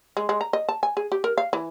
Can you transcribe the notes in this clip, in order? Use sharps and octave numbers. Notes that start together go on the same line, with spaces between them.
G#3
G#3
A#5
D#5
A5
G#5
G#4
G4
A#4
F5
E3